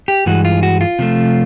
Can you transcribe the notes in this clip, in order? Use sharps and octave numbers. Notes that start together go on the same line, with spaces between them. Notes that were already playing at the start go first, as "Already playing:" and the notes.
G4
G2 E3 G#3 F#4
F4
F#4
F4
C3 F3 A3